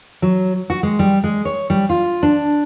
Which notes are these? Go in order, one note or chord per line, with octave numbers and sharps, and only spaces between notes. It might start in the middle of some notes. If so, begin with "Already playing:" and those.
F#3
F#4
G#3
G3
G#3
C#5
G3
F4
D4